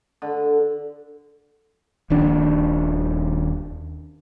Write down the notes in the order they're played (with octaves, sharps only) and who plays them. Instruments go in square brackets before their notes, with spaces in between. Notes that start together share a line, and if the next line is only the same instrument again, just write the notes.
[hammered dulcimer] D3
[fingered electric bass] D#1 D#2 D4